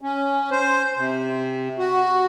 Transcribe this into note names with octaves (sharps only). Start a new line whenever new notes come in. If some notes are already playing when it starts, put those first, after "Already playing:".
C#4
C5
C3
F#4